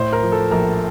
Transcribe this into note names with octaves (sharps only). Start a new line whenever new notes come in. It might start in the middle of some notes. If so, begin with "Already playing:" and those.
Already playing: A2 C5
A#4
F3
A4
A#1 A#4